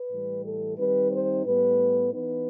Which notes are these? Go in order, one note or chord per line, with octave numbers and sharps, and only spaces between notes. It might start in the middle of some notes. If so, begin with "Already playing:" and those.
Already playing: B4
A2 E3 G3
A4
D#3 G3 C4 D#4 B4
C5
A2 G3 B3 B4
E3 B3 D#4 B4